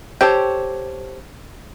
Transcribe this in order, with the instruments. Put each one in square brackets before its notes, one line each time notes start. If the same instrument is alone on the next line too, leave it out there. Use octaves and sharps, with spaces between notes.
[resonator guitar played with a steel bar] G4 C5 C#5 [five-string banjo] A4 G5